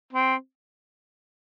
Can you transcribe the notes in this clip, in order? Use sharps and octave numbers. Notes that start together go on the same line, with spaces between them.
C4